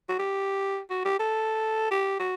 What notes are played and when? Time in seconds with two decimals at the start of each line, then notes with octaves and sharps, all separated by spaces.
0.09 F#4
0.19 G4
0.90 F#4
1.05 G4
1.19 A4
1.91 G4
2.20 F#4